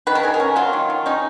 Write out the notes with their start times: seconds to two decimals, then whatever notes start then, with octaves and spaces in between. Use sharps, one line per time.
0.07 D#3 B4
0.15 A#4
0.23 D#3 G#4
0.34 A#4
0.40 C#4
0.56 F#3 F4
0.73 D#3
0.90 D#3
1.06 C#4 D#4